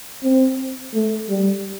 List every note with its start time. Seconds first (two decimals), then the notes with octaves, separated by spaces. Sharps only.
0.24 C4
0.95 A3
1.30 G3